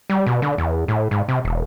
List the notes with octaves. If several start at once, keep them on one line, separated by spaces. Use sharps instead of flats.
G3
B2
D3
E2
A2
G#2
C3
E1